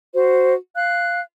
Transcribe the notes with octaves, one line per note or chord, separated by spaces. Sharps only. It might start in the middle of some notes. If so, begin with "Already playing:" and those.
F#4 C5
F5 F#6